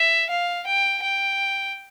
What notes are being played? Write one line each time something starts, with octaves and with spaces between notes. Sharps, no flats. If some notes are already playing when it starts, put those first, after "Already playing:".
Already playing: E5
F5
G5
G5